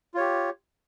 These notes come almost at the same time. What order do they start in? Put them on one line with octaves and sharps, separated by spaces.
F4 C#5 G4